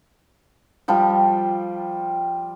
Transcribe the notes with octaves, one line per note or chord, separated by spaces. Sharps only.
F3 G3 G5